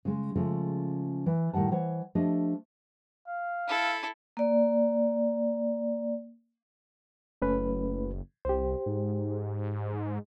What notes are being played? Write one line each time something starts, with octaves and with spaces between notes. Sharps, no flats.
C#3 G#3
C#3 F3 G#3 A3
E3
A2 D#3 G3 F#5 A5
E3 C5 C#5 F#5
F3 A3 D4 G4 D#5
F5
E4 A4
A#3 D5
F#1 A3 C#4 B4
C2 G4 C5
G#2